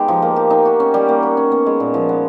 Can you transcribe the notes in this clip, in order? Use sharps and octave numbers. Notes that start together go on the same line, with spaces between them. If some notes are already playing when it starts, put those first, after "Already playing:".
Already playing: G#3 B3 D#4 G4
F3
A#3
G4
D#4
F#4
C#4
G3
A#3
F#4
C#4
B3
G#3
A#2
F3
B3